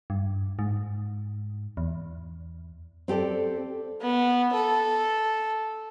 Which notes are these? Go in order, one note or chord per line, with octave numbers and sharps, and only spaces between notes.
G2
G#2
E2
C4 G4 A4 D5
B3
A4